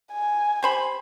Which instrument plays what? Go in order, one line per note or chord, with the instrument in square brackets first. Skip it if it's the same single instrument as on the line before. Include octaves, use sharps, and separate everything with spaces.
[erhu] G#5
[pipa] G4 C5 B5